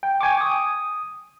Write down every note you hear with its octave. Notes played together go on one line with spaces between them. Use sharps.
G5
G5 G#5 C#6 D6
D#6